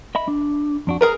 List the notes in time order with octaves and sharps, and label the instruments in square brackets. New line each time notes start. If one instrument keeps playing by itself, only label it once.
[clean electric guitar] D#5 E5 B5
D4
F2 D4 F#4
[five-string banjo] G#4 A#4 B4 [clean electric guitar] A#5